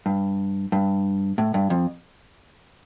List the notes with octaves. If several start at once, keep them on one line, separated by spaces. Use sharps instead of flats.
G2
G2
A2
G2
F2